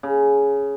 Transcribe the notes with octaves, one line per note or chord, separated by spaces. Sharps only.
C#3